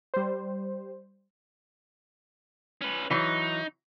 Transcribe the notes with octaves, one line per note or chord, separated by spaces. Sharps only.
G3 C5
C#4 B4
E3 F#3 D#4